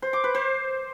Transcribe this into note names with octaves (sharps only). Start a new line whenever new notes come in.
C5
D6
B4
C5